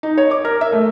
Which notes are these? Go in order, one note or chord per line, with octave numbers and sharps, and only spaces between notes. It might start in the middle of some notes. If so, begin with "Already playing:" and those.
D#4
C#5
D6
A#4
E5
A3